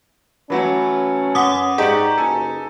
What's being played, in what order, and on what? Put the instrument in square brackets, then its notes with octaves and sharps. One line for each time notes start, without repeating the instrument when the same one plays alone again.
[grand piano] E3 F#3 A3 [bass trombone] C#4 [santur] B4
[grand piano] F#2 [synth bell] F#5 D6 D#6
[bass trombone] G#2 [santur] D#4 [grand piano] G4 D5 F#5 [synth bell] G#4
[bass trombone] F#1 [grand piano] A4 G#5